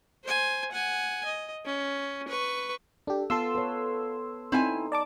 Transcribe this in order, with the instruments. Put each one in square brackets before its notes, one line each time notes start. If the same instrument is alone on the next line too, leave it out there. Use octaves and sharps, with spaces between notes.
[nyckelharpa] C5 G#5
F#5 G#5
D#5
C#4
B4 C#6
[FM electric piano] D4 G4 [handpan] A4
[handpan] B3 [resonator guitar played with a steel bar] F4 [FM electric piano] A4 C6 E6
[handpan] B4 C#5
[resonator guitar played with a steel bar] C4 E4 G#5 [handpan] D#4
[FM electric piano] D5 A5 D6